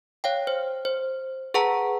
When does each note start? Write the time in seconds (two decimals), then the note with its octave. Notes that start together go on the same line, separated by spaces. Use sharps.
0.24 C#5 F5 G5
0.47 C5
0.85 C5
1.54 G#4 B4 F#5 A5 A#5